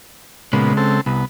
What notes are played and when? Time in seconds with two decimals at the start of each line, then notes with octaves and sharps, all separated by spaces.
0.53 A#2 C#3 G#3 B3
0.77 C4 A4
1.06 C2 B3